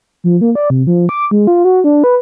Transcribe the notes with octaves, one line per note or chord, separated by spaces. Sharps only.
F3
A#3
D5
C3
F3
D6
G#3
F4
F#4
D4
B4